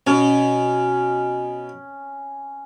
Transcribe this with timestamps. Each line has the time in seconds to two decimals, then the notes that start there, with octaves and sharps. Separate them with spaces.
0.07 B2 C#4